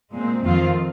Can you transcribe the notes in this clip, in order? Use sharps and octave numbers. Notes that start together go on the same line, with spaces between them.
A#2 G#3 C4
F2 D#3 C4 F4